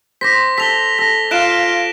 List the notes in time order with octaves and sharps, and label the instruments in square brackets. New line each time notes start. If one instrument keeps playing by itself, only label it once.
[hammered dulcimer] C5 [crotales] D6 A#6 B6
[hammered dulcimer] A4 [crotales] B6 F7 G7
[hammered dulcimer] A4 [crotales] A#6
[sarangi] F4 [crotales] F#6 D7 E7